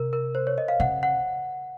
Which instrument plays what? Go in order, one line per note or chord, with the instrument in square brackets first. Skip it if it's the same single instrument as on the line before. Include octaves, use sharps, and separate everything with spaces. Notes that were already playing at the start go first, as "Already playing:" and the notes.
Already playing: [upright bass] C3 [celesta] A#4
[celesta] A#4
C5
C#5
D#5
F5
[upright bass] C#3 [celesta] F#5
[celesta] F#5